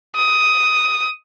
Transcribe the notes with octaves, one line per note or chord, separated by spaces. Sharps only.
D#6